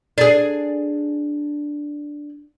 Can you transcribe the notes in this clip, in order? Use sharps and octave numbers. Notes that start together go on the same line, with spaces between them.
D4 G#4